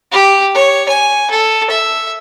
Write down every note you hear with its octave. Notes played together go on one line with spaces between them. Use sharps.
G4
C#5
G#5
A4
E5